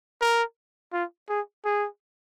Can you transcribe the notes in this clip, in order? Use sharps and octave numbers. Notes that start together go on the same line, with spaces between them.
A#4
F4
G#4
G#4